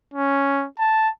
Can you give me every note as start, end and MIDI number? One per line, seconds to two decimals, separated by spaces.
0.14 0.66 61
0.79 1.09 81